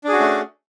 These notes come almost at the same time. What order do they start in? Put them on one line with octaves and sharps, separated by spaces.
D4 G#4 F#4 C#4 A3